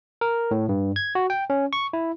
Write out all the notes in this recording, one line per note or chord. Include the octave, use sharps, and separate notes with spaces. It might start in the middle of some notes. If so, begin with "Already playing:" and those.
A#4
A2
G2
G#6
F#4
G5
C#4
C#6
E4